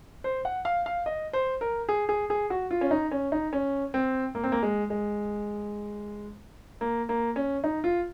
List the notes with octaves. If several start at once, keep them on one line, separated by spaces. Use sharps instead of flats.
C5
F#5
F5
F5
D#5
C5
A#4
G#4
G#4
G#4
F#4
F4
C#4
D#4
C#4
D#4
C#4
C4
A#3
C4
A#3
G#3
G#3
A#3
A#3
C#4
D#4
F4